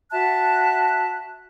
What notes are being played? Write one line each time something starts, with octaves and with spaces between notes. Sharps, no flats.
F#4 E5 A5 F#6